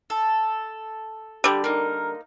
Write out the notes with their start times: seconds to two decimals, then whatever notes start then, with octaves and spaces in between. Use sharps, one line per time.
0.10 A4
1.44 D3 G3 G4
1.64 A#3 D#4 A#4